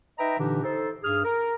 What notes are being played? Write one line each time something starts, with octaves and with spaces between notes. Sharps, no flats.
D#4 B4 D#5 E5 G5 A#5
A#2 D3 E3 D4 D#4 G4
D#4 A4 C5
G2 G#4 F6
A#4